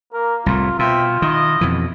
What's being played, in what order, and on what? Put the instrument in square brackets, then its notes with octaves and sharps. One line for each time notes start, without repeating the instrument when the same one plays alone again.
[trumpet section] A#3 [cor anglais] A#4
[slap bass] C2 A2 [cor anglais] F4
[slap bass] B2 [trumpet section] C4 E5 G5 [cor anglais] F4
[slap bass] D#3 [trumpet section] E4 D#5
[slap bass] F2 B2 E3